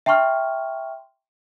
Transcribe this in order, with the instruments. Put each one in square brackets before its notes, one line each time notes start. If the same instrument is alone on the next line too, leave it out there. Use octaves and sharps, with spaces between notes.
[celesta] E5 G5 A5 C6 C#6 F6